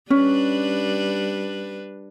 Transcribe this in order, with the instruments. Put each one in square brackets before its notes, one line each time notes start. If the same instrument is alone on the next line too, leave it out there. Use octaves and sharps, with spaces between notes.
[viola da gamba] G3 D4 B4 [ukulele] C#4